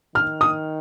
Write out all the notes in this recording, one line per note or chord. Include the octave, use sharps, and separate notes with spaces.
D#3 F6
D#6